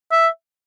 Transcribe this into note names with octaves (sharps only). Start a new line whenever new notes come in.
E5